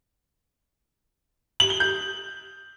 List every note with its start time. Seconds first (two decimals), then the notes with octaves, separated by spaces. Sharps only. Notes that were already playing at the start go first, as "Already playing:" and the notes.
1.60 F#7
1.70 G7
1.80 G6